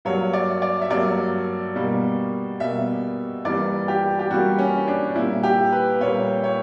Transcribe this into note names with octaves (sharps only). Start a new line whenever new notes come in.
G2 F#3 A#3 C#5
D5
D5
E5
G2 F#3 A#3 D5
B2 G3 A#3
B2 G3 A#3 E5
G2 E3 G3 A#3 D5
G4
G4
G2 E3 G3 A#3 F#4
C#4
D4
A#2 G3 A#3 E4
G4
B4
A#2 G3 A#3 C#5
C#5